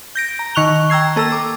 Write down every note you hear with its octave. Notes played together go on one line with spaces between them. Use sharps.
G6 A#6 D7
A#5
D#3 C#6 F#6 F7 G7
G5 A#5 E6 G#6 C7
A#3 A4 A#5 E6
D6